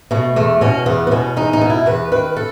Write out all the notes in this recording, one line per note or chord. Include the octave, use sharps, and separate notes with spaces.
B2 A3
E2 A3
B2 C#4
E2 B3
B3
B2 C#4
E2 D#4
D#4
B2
E4
E2 B4
D#3 B4
A4